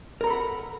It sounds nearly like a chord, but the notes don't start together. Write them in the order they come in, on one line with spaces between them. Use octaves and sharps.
A#4 A#5 A4 B5 F#5